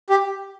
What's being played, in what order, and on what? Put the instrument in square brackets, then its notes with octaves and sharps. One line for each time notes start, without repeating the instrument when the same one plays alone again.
[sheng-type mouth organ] G4